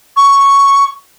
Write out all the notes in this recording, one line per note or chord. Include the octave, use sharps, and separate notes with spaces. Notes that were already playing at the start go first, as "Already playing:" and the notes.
C#6